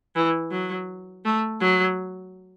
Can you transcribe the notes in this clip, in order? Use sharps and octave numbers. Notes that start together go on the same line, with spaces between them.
E3
F#3
A3
F#3